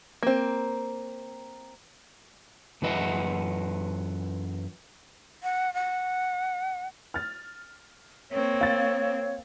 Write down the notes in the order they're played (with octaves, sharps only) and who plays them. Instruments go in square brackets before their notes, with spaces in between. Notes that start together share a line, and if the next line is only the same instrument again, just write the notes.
[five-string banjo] A#3 C4
[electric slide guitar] F#2 E3 B4 D#5 E5 F#5
[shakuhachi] F#5
F#5
[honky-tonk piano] F6 A6
[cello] A#3 C4 [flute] C#5
[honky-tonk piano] F5 A6